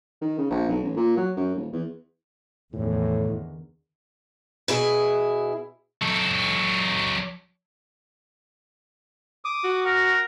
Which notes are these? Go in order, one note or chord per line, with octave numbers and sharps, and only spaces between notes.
D#3
C#3
A#1
B1
A1
A#2
F#3
F#2
D#1
E2
E2 A2 D3 D#3
B2 E4 G#4
F#3 A4
D6 D#6
F#4
A#4 F#5